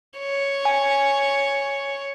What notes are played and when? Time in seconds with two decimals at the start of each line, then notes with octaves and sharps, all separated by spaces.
0.19 C#5
0.65 G#5